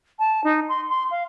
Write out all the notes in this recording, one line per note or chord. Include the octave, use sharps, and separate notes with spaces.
A5
D#4
C6
C6
F5